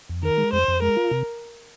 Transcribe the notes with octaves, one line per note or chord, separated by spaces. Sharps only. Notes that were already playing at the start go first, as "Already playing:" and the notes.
F2
D#3 A#4
G#3
F2 C5
F2
G#3 A#4
F4
C3